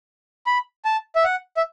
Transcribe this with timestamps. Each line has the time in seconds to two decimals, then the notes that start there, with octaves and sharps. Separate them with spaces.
0.47 B5
0.85 A5
1.16 E5
1.24 F#5
1.57 E5